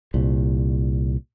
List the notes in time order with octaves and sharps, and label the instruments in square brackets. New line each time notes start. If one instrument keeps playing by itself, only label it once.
[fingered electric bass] C2 A#2